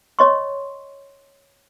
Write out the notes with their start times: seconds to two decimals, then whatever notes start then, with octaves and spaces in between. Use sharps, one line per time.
0.19 C#5 D#5 C6 C#6